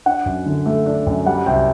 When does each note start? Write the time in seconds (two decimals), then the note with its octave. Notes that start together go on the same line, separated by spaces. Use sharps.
0.06 D4 F#5
0.26 F#2
0.46 D3
0.66 A3
0.86 D4
1.07 F#2
1.26 G3 F#5
1.46 C2 G5